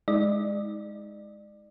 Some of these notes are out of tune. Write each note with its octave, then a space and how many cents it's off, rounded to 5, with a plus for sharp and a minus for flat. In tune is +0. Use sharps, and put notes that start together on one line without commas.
G#3 +0 D#4 +30 D5 +30